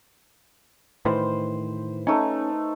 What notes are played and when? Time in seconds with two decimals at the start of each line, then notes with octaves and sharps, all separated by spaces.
1.05 A2 D#3 E3 B4 C5
2.07 A3 C#4 D#4